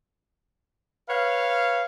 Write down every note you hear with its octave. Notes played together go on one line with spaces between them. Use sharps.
B4 C#5 F5